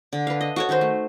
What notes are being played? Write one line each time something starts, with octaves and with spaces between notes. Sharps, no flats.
D3
B4 F5
D#5
F#4 A4 C#5
D#3 C#4 D#4 C5
A3